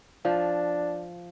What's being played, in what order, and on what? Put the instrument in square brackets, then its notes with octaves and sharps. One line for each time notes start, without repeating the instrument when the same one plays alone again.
[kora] F3 [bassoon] D4